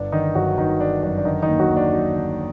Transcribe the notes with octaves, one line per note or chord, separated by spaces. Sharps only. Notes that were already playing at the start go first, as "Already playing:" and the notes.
Already playing: G1 D4
D3 D#3 D#4
G1 F#3 F#4
G1 D#3 D#4
D3 D4
F#2 D4
D4
D3 D#3 D#4
D#3 D#4
D#2
F#3 F#4
D#2
D4
F#3
D3